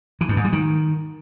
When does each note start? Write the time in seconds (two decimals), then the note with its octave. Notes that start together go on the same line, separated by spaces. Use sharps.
0.21 E3
0.29 G2
0.37 G#2
0.45 G3
0.52 D#3